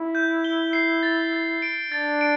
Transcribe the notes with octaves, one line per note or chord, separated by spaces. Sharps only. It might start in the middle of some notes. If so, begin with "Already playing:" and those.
Already playing: E4
G6
G7
C7
A6
A6
D7
D4 A6
D7